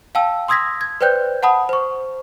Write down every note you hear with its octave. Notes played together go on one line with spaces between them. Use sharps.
F5 G5 A5 E6
C6 D#6 E6 G#6 A#6 B6
G#6
B4 C5 D5 G5 F#6 G6
F#5 A5 B5 D#6
C5 C#6